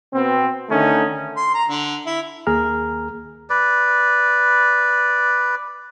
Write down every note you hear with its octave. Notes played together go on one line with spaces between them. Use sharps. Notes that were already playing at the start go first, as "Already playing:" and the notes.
B2 B3 C4
D3 D#3 A3 C#4 D#4
C6
A#5
D3
E4
D#2 A#3 G#4 A#5 F6
B4 D5